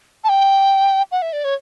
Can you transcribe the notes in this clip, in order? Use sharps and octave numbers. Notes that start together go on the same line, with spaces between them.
A5
G5
F#5
E5
D5
C#5